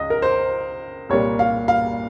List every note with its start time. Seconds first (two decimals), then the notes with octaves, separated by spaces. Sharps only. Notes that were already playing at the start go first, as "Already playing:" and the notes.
Already playing: C#2 D#5
0.10 A#4
0.22 C5
1.09 C2 A#2 G3 A#3 C#5
1.39 F5
1.68 F5